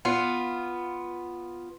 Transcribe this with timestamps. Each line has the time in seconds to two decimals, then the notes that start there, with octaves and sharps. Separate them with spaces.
0.05 B3 F4